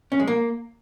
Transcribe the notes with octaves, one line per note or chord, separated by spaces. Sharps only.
C#4
G#3
A#3